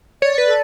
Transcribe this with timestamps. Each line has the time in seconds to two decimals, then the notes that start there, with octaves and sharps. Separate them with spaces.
0.22 C#5 D5
0.38 B4
0.46 A4